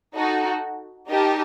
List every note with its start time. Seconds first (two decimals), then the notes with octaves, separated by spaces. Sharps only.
0.14 D#4 F#4 A4
1.08 D#4 G4 A#4 D#5 A5